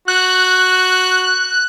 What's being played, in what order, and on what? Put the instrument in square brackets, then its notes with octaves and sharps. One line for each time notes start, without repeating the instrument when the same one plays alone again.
[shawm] F#4 [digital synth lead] F#6